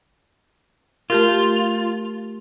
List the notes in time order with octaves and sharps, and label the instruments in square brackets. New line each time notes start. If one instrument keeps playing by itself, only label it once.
[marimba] A3 G4 A#4 [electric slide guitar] F4